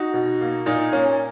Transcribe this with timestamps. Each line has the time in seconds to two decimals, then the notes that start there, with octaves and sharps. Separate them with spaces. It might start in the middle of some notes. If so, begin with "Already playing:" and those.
Already playing: D#4 F#4
0.14 B2
0.41 A#3
0.66 A#2 D#4
0.92 A#3 C#4